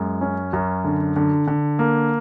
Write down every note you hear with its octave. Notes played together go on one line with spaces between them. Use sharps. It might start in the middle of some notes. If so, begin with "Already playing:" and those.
Already playing: F#2 G#3
C#4
F#2
D3
D3
D3
A#3